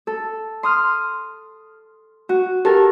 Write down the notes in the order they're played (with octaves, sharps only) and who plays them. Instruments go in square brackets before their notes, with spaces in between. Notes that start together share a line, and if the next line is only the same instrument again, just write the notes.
[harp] A4
C6 D#6 F6
F#4
[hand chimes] G4 [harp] A4 A#4 A5